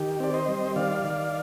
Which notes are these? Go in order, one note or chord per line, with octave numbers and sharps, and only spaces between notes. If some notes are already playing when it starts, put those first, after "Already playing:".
Already playing: D#3 G4
C4 D5
C5 D#5
G3
D#3 D5 F5
D#3